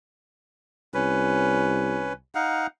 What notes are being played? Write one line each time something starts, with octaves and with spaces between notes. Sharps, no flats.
C2 C#4 B4
D#4 F5 F#5